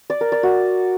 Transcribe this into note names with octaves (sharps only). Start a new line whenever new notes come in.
D5
A#4
D5
F#4